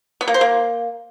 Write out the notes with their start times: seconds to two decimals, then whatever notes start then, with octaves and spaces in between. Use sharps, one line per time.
0.21 B3
0.28 A#3
0.34 C5
0.41 A#3